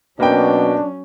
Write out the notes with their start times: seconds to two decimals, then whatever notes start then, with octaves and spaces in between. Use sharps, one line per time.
0.20 B2 F#3 A#3 B3 C#4 D4 G5